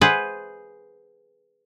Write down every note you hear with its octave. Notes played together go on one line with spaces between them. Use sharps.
G#4 B4 C5 E5 F#5